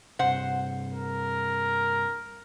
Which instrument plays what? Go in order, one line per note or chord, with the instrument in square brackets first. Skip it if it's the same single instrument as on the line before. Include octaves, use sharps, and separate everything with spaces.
[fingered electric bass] G2 C3 [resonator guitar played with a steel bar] C5 F#5
[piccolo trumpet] A#4